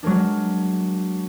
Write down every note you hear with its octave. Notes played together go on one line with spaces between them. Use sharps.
F#3 G#3 A#3 D4